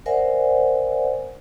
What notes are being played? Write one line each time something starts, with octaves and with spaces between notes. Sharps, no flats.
A#4 C5 D5 E5 F#5 G#5